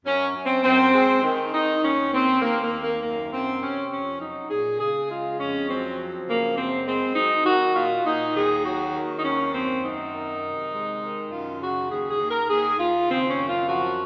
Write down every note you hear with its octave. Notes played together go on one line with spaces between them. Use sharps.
F#2 C#4
F#2
C4
F#2 C4
G#3
D#3
D#3 D#4
D#2 C#4
D#2 C4
D#2 A#3
A#3
D#2
A#3
F#2 A#3
F#2 C4
C3 C#4
F2 C#4
F#3 D#4
A#2 G#4
C#3 G#4
G#3 F4
F2 C#4
F#3 C4
F3
C#3 A#3
F#2 C4
G#3 C4
F#3 D#4
D#3 F#4
A#2 F4
A#2 D#4
D#2 G#4
F#3 F#4
D#3
D#4
D#2 C#4
F#2 C4
F#2 D#4
D#3
C3
G#3
D#3
F#2 F4
C#3 F#4
D#2 G#4
G#4
D#2
A#4
D#2 G#4
D#2 F4
C#3 C4
C#4
F#2
F4
F3 F#4